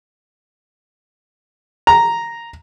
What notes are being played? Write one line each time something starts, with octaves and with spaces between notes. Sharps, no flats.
A#5